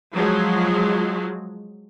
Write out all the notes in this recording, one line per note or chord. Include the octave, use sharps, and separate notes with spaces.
F3 F#3 G#3